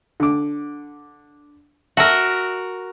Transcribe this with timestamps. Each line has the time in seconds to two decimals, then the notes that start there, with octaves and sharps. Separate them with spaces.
0.20 D3 D6
1.97 F#4 A#4 E5 A5 E6